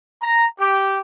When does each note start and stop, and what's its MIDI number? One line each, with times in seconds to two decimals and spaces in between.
0.22 0.46 82
0.59 0.99 67